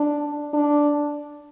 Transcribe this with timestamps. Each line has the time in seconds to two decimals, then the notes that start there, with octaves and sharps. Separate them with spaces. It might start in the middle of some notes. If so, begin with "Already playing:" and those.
Already playing: D4
0.53 D4